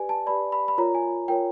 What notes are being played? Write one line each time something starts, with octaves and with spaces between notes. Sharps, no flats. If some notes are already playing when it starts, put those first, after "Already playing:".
Already playing: G4 B4 D5 G#5
A5
G4 B4 D5 B5
B5
B5
F4 A#4 C#5 A#5
G#5
F4 A#4 C#5 G5